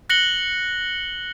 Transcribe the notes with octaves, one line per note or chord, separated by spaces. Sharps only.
F#6 A#6 C#7 F#7 G7